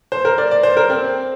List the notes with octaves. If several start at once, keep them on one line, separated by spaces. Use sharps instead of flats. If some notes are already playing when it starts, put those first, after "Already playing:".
C5
A#4
D5
D5
C5
A#4
C4